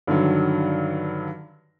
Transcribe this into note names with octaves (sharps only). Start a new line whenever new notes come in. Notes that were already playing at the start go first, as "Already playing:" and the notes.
G2 D3 D#3 F#3